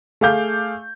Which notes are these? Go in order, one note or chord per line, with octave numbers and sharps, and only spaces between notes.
A3 G#4 F5 D6 G6